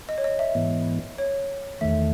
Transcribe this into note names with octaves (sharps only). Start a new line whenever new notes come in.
D#5
C#5
D#5
E5
G#2 E3 B3
C#5
E2 D#3 A3 E5